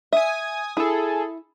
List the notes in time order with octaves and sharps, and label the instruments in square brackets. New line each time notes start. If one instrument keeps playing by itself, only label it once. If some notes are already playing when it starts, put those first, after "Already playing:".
[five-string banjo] E5 [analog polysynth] G#5 D#6
[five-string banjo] E4 [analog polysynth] G#4 A4